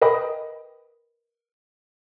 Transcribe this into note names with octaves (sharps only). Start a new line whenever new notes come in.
A#4 B4 D#5 G5 B5 D#6